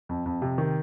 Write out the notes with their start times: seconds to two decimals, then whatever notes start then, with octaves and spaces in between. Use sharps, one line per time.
0.09 F2
0.26 F2
0.42 C3
0.58 D#3